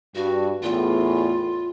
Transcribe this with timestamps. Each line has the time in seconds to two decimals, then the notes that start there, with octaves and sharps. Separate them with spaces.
0.15 G2 F#4
0.63 E2 A2 F4